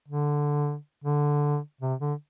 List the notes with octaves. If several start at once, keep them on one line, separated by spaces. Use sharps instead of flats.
D3
D3
C3
D3